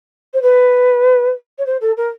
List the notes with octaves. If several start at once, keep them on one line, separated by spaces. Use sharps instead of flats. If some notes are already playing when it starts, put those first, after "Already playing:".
C5
B4
C#5
C5
A4
A#4